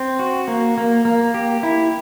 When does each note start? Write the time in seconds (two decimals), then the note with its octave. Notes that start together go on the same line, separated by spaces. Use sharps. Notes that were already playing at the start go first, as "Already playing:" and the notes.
Already playing: C4
0.19 F#4
0.48 A#3
0.78 A#3
1.05 A#3
1.34 G4
1.63 E4